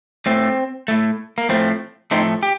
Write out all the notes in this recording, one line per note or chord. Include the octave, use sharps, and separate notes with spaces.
A2 A3 C4
A2 A3
A#3
A2 F3 A3 C4
A2 F3 A3 C4 D#4
G4